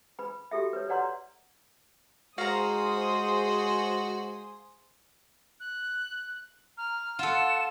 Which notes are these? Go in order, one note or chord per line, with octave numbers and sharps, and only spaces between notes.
B4 B5
F#4 G4 A4 E5
B4 C#5
B4 C#5 D5 F#5 A#5 C6
G#3 F#4 G#4 C5 F5 A#5 D#6
F#6
A#5 F6
F4 A4 F#5 E7